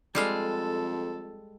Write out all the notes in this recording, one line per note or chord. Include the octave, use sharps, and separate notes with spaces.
F2 G3 G#3 A4 F5